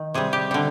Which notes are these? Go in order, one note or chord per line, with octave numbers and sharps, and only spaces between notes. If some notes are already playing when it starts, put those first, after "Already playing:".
Already playing: D#3
C3 G3 G#4
G4
D3 G3